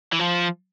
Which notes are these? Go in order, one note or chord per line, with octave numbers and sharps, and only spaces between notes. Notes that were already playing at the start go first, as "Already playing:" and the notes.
E3
F3